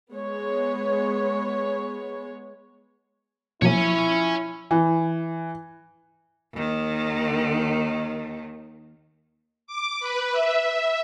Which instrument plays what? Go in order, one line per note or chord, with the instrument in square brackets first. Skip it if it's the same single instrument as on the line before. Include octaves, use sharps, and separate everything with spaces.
[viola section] G#3 B3 C#5
[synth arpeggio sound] B2 F#3 A#3 [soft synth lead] F3 [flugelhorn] E4 [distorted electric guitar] C#5 G#5
[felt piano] E3
[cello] D#2 D#3
[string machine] D6
B4
E5